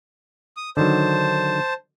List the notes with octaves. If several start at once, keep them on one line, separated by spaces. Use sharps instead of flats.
D#6
D3 D#3 F#3 C5 A5